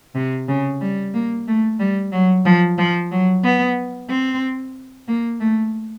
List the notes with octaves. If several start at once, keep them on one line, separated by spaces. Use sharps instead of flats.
C3
C#3
G3
A#3
A3
G3
F#3
F3
F3
F#3
B3
C4
A#3
A3